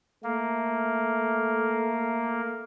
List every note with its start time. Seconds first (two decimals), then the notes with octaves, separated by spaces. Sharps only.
0.24 A3 A#3